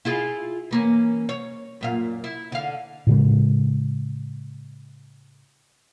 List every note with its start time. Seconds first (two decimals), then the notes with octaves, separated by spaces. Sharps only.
0.05 E4 F4 G#4
0.71 E3 A#3 C#4
1.29 C#5
1.81 F#2 A#2 F5
2.24 E4
2.52 D3 F5
3.07 A2 C#3 G#3